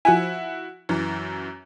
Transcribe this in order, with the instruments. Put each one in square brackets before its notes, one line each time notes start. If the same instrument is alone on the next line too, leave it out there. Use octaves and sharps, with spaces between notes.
[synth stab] F3 G#5 [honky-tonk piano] E4 F#4
[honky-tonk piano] F#2 E3